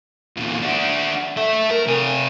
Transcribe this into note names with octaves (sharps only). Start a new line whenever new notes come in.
E2 A#2
D4 F#4
A4 E5
A#4
C3 G#5